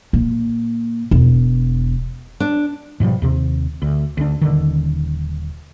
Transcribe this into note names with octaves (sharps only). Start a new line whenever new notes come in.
A#2
E1
D4
G#2 B2 F3 G3
D#2 C3
D2
D2 D4
D#1 D3 D#3